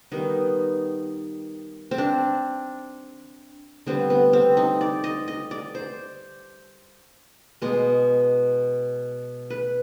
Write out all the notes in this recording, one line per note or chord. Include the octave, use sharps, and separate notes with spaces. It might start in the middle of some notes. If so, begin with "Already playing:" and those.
D#3 G3 B3 D#4
C4
D4
D3 G3 B3 C4
B3
C4
D#4
D5
D#5
D#5
D5
C5
B2 G#3 B3
B4